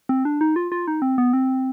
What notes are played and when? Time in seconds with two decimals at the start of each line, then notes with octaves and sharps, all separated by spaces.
0.09 C4
0.25 D4
0.41 D#4
0.56 F4
0.72 F4
0.88 D#4
1.02 C4
1.18 B3
1.33 C4